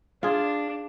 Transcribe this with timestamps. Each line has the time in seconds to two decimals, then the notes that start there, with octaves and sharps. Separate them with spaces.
0.23 D4 F4 G#4